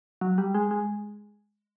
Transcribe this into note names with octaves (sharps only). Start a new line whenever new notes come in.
F#3
G3
G#3
G#3